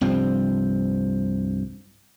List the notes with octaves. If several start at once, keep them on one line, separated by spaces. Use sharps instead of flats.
C2 G2 F3 C4